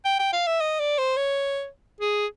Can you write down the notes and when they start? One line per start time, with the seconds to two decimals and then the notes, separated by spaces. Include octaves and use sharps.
0.05 G5
0.19 G5
0.33 F5
0.47 E5
0.61 D#5
0.80 D5
0.98 C5
1.17 C#5
2.01 G#4